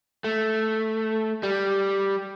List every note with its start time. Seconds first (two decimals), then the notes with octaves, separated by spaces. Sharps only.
0.24 A3
1.43 G3